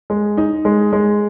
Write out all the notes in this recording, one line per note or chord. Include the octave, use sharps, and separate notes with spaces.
G#3
D#4
G#3
G#3